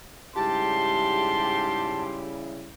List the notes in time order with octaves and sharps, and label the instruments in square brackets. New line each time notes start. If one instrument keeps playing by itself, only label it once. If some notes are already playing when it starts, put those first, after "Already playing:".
[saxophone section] G#2 G4 [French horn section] C#3 G3 E4 [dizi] A5 [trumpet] C6